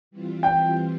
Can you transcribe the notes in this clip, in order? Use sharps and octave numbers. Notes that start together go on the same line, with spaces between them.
E3 G3 C4 F4
G5